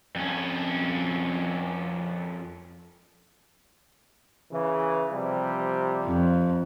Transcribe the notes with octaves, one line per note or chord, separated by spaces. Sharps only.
F2 C#4
C#3 E3
C3 F3 G3
F2